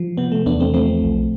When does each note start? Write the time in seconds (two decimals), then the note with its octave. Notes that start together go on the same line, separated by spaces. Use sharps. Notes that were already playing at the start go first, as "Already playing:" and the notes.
Already playing: F3
0.17 C3 B3
0.32 A3
0.46 E2 B3 D4
0.60 A3 C4
0.74 F3 A3 C4
1.02 B1